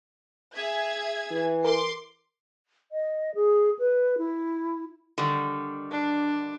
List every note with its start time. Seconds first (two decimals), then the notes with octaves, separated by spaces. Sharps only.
0.54 G#4 E5 G#6
1.31 E3
1.64 A#4 C6 D6 C7
2.92 D#5
3.35 G#4
3.79 B4
4.18 E4
5.18 D3 D#3 G3
5.91 D4